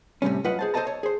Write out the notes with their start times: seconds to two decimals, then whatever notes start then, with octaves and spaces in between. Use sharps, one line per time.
0.22 A2 C3 G3 C#4
0.44 F#2 F4 B4 D#5 F#5
0.59 G#4 C5 A5
0.74 A4 C5 C#5 D#5 A5 A#5
0.87 C#5
1.03 G#4 C5